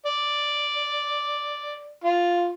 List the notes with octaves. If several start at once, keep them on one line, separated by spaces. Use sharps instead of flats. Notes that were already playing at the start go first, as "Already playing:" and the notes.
D5
F4